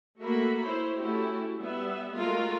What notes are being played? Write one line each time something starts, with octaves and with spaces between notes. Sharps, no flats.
A3 A#3 F#4 E5 B5
E4 C5 C#5
A3 C#4 E4 F#4 G4
G3 B3 E5
G#3 A3 F4 F#4 A#4